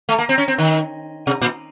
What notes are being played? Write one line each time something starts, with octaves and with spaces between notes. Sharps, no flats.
A3
A#3
C4
C#4
C4
D#3
C3
A#2